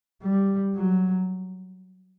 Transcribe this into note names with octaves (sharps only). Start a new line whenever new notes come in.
G3
F#3